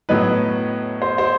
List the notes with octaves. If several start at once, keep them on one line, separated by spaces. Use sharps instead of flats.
A2 F#3 B3 D#4 B4
C5
C5